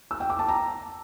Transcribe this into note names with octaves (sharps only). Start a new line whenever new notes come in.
E6
G5
D6
A5
A#5